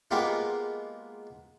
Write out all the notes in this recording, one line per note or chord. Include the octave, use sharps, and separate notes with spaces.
G#3 A#3 B3 F4 G4